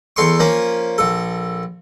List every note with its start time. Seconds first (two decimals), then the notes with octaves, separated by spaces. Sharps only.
0.16 E2 A4 C6 C#6
0.40 F3 A#3 C#4
0.98 A#1 A4